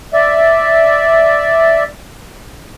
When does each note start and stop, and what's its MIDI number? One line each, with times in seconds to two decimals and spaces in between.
0.13 1.84 74
0.13 1.84 76